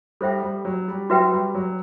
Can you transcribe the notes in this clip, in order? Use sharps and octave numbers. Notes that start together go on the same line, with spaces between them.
G3 A4 C5 E5 G5
G3
F#3
G3
F#3 F#4 B4 E5 G5
G3
F#3